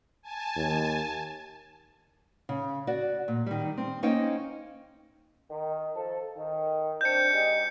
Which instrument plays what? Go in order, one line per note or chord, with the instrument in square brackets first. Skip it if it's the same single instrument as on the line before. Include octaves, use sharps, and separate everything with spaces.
[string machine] G#5 A5
[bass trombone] D#2
[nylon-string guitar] C#3
F#4 D5
A#2
D#3 G3
C4
A#3 C#4 D#4 C5 G5
[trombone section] D#3
F3 A4
D#3
[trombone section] C4 D4 [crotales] G6 C#7
[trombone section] G#3 D#4 G4